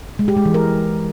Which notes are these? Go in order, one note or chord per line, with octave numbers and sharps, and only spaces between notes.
G#3
G4
G#3
E3
A#4